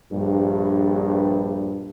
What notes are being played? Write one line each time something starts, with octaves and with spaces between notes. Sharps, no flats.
A#1 G2